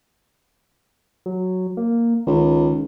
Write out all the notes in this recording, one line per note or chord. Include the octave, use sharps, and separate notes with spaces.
F#3
A#3
C#2 D#3